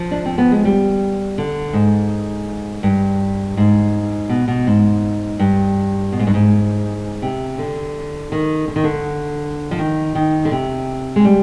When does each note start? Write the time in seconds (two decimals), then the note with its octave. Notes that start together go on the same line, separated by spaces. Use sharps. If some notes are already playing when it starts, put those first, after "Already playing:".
Already playing: F3
0.11 D4
0.26 C4
0.38 B3
0.52 G#3
0.65 G3
1.38 D3
1.73 G#2
2.83 G2
3.57 G#2
4.29 B2
4.48 B2
4.67 G#2
5.39 G2
6.12 B2
6.19 G#2
6.27 G2
6.34 G#2
7.22 C3
7.58 D3
8.32 D#3
8.68 D3
8.76 D#3
8.84 D3
9.71 F3
9.78 D#3
10.15 D#3
10.45 D3
10.51 C3
11.16 G#3
11.25 G3